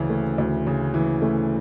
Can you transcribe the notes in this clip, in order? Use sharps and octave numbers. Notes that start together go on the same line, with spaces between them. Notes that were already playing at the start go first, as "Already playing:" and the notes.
Already playing: D2 C#3 E3
A3
D2
C#3
E3
A3